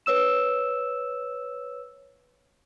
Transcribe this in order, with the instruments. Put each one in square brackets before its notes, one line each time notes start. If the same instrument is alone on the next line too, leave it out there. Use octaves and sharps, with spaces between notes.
[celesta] B4 C#5 E6 E7